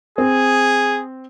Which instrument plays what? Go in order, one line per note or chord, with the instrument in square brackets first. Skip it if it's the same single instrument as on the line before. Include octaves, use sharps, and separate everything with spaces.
[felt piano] C4 [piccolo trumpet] G#4